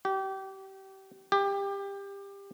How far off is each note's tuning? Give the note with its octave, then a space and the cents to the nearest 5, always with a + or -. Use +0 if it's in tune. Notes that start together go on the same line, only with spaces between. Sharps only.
G4 -30
G4 +20